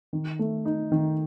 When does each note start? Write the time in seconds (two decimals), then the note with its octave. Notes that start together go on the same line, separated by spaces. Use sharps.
0.13 D#3
0.39 A3
0.65 D#4
0.92 D#3